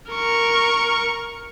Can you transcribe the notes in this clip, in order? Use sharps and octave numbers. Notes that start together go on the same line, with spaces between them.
A#4 C#6